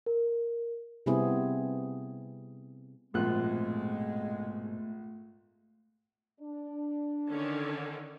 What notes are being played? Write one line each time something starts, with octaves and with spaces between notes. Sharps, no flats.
A#4
C3 G3 B3 C4 E4 G#4
A#1 G#2 B2 G#3 A3 C4 F4 F#6
D4
D3 D#3 C#4